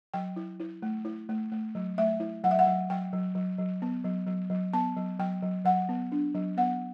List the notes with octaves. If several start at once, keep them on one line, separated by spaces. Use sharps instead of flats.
F#3 G5
E4
E4
A3
E4
A3
A3
F#3
A3 E5
E4
F#3 F#5
E5
F#5
F#3
F#3 G5
F#3
F#3
F#3
B3
F#3
F#3
F#3
B3 A5
F#3
F#3 G5
F#3
F#3 F#5
B3
D4
F#3
B3 F#5